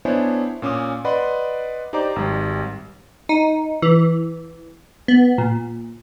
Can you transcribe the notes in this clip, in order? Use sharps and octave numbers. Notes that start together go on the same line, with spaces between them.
B3 D4 E4 C5 C#5 G#5
A#2 C#4 D6 D#6
B4 D5 D#5 F#5 B5 C6
D#4 G4 C5 D5 A#5 D6
G#1 G3
D#4
E3
B3
A#2